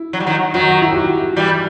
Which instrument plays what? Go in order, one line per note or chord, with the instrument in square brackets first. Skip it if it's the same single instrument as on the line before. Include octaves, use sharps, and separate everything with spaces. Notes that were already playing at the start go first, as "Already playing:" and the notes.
Already playing: [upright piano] E4
[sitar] F#3
G3
D#3 F#3
[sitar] D#3 F#3 [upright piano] F#4
[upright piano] F#4
E4
G4
F#4
[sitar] E3 G3